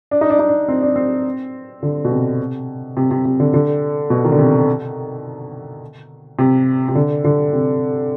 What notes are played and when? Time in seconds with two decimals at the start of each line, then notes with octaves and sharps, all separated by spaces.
0.11 D4
0.21 D#4
0.30 D4
0.39 D#4
0.49 D4
0.68 C4
0.82 D4
0.96 C4
1.83 D3
2.05 B2
2.11 C3
2.97 C3
3.11 C3
3.25 C3
3.40 D3
3.54 D3
4.10 B2
4.24 D#3
4.32 D3
4.39 C3
6.39 C3
6.89 C3
6.95 D3
7.24 D3
7.53 C3